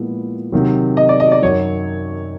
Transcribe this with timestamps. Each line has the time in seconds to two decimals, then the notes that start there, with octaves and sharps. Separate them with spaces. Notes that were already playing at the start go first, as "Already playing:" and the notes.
Already playing: A#2 F3 G#3 B3 E4
0.52 C3 D#3 F#3
0.97 D#5
1.09 D5
1.20 D#5
1.32 D5
1.42 F#2 D#3 F#3 C#5